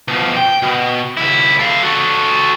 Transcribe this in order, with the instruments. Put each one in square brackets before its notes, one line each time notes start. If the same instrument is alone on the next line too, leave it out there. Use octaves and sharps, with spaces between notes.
[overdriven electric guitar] B2 F3
G5
B2
C#2 E4
A4 F5
F#4 A4